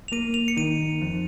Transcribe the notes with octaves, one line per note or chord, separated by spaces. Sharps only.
F7
A#3 D#7
F7
C#7
D#3 D#7
F2